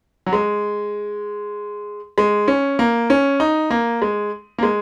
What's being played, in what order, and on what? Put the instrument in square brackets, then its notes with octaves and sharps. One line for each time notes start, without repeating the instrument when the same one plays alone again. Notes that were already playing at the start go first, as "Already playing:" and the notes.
[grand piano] F#3
G#3
G#3
C#4
A#3
C#4
D#4
A#3
G#3
A#3
G#3